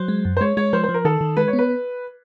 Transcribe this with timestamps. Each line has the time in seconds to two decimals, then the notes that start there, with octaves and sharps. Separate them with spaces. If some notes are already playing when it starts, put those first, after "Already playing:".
Already playing: F#3 C5
0.08 G#3
0.25 F#2
0.37 C5
0.41 G#3 C#5
0.57 G#3 C#5
0.73 F3 C5
0.84 C5
0.89 F3
0.94 A#4
1.05 D#3 A4
1.21 D#3
1.37 G#3 B4
1.48 C#5
1.53 B3
1.59 B4